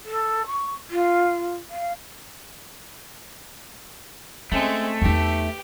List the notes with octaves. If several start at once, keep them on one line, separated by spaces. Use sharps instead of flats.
A4
C#6
F4
F5
G#3 A3 C4 C#4
E2 D#4 G4 B4